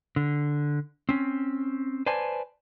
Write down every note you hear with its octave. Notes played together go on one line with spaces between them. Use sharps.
D3
C4 C#4
B4 C5 D5 G#5 A5